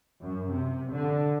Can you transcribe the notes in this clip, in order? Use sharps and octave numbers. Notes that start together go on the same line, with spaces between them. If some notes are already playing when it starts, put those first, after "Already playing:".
F#2
C3
D3